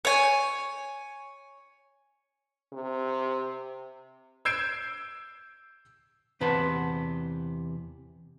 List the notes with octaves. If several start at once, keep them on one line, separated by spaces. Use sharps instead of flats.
C#5 G#5
C3
E6 G6 G#6 C7 D7 E7
E2 C3 B4 F#5 A5 C6